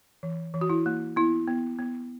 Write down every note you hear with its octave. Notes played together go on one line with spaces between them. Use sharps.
E3
E3
F#4
E4
A#3
B3 E4
B3
B3